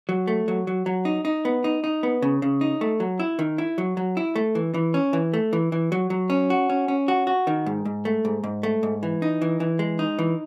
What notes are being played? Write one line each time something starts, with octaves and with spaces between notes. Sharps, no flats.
F#3
A3
F#3
F#3
F#3
D#4
D#4
B3
D#4
D#4
B3
C#3
C#3
D#4
A3
F#3
E4
D#3
E4
F#3
F#3
E4
A3
E3
E3
C#4
E3
A3
E3
E3
F#3
F#3
C#4
F#4
C#4
C#4
F#4
F#4
D#3
G#2
G#2
A3
G#2
G#2
A3
G#2
E3
D#4
E3
E3
G#3
D#4
E3